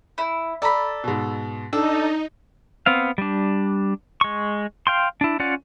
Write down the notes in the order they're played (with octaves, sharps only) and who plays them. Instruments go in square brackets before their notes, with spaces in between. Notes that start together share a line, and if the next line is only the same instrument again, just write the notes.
[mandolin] E4
[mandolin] A4 B5 [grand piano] D5 A#5
[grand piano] G#2 B2
[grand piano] D4 [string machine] D#4 [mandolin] A4
[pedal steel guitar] B3 C4 F5
G3 D4
G#3 C#6
F5 G5 C6
D4 E4
C#4 F4 D5 F#5